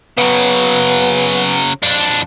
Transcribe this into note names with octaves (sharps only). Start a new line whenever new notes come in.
C#3 F#3 B3
F2 D4